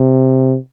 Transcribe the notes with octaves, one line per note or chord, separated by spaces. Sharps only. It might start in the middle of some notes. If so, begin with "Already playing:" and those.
Already playing: C3